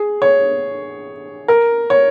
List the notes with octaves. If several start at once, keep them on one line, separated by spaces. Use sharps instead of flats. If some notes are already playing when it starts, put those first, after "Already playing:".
Already playing: G#4
C#5
A#4
C#5